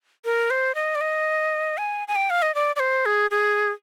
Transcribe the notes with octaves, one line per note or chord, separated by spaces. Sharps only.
A#4
C5
D#5
D5
D#5
G#5
G#5
G5
F5
D#5
D5
D5
C5
G#4
G#4